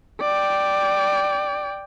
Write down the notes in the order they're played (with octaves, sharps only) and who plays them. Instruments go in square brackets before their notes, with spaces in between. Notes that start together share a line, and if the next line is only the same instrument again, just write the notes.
[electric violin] D5 G5